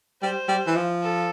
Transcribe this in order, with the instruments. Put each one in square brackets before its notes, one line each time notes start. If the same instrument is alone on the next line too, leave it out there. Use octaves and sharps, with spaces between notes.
[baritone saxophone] G3 [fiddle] C5
[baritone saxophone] G3
E3
F3
[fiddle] A4